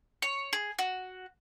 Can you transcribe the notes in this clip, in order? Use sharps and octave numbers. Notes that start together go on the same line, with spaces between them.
C#5
G#4
F#4